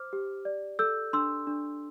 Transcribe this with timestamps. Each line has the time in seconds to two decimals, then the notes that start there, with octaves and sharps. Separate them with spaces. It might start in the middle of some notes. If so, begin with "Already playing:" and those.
Already playing: C5 D6 F6
0.13 G4
0.45 D5
0.79 A4 E6 G6
1.13 D4 C6 E6
1.47 D4